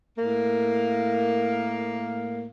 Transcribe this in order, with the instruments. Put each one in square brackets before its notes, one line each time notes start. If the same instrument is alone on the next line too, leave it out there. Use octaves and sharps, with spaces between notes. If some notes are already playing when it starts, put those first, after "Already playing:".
[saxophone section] A2 A#3